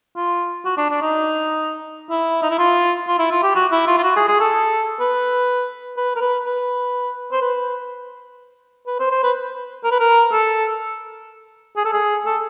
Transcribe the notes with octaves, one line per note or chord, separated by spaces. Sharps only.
F4
F#4
D4
D4
D#4
E4
D#4
E4
F4
F4
E4
F4
G4
F#4
E4
F4
F4
F#4
G#4
G#4
A4
B4
B4
A#4
B4
B4
C5
B4
B4
C5
C5
B4
A#4
B4
A#4
A4
G#4
A4
G#4
A4